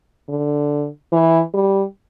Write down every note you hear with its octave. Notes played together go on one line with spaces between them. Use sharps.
D3
E3
G3